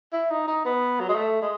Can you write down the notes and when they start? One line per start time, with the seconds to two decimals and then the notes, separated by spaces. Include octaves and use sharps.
0.13 E4
0.30 D#4
0.48 D#4
0.65 B3
1.00 F#3
1.09 G#3
1.16 A3
1.42 G#3